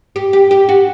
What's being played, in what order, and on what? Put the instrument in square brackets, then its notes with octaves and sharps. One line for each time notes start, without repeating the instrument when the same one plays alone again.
[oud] G4
G4
G4
F#4